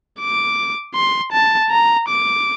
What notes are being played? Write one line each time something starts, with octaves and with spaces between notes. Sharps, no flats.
D6
C6
A5
A#5
D6